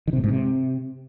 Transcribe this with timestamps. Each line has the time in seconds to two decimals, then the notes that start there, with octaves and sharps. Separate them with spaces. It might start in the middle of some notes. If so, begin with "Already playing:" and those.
0.08 D#3
0.13 C3
0.18 A2
0.24 G#2
0.29 C3